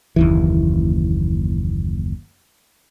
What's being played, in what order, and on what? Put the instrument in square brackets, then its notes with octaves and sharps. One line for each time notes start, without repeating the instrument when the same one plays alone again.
[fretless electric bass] F#1 D#2 E3